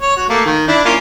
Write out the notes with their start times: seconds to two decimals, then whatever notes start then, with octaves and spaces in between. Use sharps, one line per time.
0.01 C#5
0.17 F#4
0.29 A3 A#3
0.46 D#3
0.68 D4 E4
0.85 A#3 C#4 F4